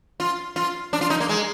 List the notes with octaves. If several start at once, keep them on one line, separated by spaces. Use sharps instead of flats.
F4
F4
D4
F4
D#4
A#3
G#3